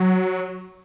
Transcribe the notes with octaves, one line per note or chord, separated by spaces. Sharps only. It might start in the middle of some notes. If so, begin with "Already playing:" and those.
Already playing: F#3